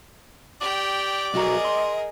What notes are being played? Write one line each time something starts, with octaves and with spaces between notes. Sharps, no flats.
G4 D5 G5
B1 F#4 G#4 A#4 D#5 A#5
C6